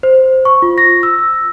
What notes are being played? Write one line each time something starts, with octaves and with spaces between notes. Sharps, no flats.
C5
C#6
F4
A#6
E6